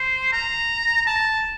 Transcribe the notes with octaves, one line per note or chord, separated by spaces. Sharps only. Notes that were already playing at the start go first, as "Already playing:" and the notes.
Already playing: C5
A#5
A5